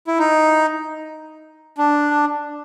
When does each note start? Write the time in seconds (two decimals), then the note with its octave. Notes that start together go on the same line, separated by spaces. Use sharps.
0.07 E4
0.19 D#4
1.78 D4